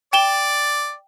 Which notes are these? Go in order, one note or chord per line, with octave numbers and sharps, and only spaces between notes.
D5 G5 E7 G7